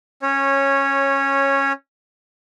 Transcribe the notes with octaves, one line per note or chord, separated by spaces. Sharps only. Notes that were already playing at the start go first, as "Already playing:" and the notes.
C#4 C#5